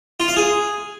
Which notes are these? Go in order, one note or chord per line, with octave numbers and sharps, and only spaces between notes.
F4
F5
G#4